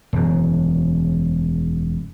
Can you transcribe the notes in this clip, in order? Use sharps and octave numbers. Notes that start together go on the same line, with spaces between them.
E1 F#2